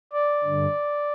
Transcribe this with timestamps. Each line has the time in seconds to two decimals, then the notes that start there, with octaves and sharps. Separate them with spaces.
0.13 D5
0.44 G2 D3